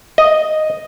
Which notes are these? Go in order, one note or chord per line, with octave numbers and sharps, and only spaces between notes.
D#5